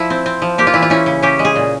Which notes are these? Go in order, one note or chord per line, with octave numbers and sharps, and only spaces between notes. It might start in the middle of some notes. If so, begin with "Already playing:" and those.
Already playing: F3 E4
C4
C4
F3
A#3 G4
F4
E3 E4
F4
C#4 E4
C#3
C#4 G4
G#3
G#4
A#2